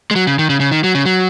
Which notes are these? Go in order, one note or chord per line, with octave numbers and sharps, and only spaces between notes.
G#3
F#3
C#3
D#3
C#3
C#3
D#3
F#3
C#3
F#3